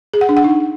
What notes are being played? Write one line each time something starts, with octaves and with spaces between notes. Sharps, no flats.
G#4
F#5
D4
F#5
D#4